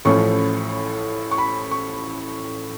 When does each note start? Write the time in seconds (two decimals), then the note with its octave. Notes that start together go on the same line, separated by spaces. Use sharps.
0.05 A1 A2 F3 A3 C#4 C#6
1.31 C#6
1.38 B5
1.71 C#6